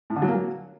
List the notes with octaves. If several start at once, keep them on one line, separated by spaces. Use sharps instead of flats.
A2
D3
F#3
A#3
F#3